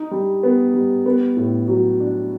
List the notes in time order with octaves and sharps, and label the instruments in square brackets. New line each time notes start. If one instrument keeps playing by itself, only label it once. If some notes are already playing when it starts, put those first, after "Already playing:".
Already playing: [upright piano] D#4
G3
B3
G3
B3
A2
F#3
D4